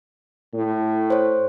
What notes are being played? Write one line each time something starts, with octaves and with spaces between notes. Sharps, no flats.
A2
C5 C#5